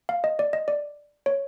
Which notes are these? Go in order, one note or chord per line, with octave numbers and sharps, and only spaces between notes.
F5
D#5
D5
D#5
D5
C#5